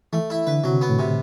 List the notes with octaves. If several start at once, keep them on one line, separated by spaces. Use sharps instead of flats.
E3 A3
E4
D3 B4
C3 F#3
B3
A2
C3